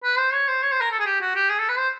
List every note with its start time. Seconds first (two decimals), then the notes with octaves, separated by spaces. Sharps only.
0.04 B4
0.18 C5
0.33 C#5
0.48 C5
0.62 C#5
0.71 C5
0.81 A#4
0.91 A4
0.99 G#4
1.06 G4
1.21 F#4
1.35 G4
1.50 G#4
1.59 A4
1.69 B4
1.78 C5